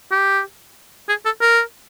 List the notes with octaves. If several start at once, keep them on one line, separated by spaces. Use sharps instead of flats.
G4
G#4
A4
A#4